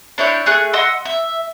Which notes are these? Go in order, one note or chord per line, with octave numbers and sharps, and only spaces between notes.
D4 E4 C#5 G6
A3 G#4 F#6
D#5 F#5 C6 E6
E5